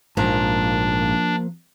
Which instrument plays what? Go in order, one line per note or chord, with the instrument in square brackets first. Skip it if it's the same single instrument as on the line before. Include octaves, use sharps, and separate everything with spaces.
[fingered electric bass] A#1 G#2 [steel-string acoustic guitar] F3 A#3 A#5 [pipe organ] D4